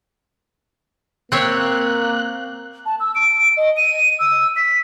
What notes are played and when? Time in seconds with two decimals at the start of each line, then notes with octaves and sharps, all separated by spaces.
1.32 A#3 C4 C#5 E5 F#6
2.86 A5
3.00 E6
3.15 D7
3.57 D#5
3.77 D#7
4.19 E6
4.56 B6